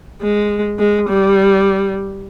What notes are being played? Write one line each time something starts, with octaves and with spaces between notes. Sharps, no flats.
G#3
G#3
G3